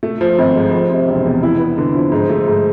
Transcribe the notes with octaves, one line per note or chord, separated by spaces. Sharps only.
A3
F3
G#1
G#2
F3
C3
E1
E2
E4
B3
D3
F3
G#2
A3
G#2